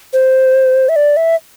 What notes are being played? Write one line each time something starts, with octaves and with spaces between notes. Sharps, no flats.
C5
E5
D5
E5